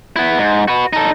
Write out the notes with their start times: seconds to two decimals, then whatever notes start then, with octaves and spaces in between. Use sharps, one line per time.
0.16 B3 E4
0.38 G#2
0.68 F#4 B4
0.93 D#4 A4